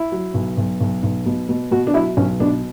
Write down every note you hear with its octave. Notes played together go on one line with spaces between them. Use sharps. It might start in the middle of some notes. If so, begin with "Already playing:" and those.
Already playing: E4
F#3
B1
B1
B1
B1
B2
B2
B2 F#4
D4
F#3 E4
B1 C#4
B2 D4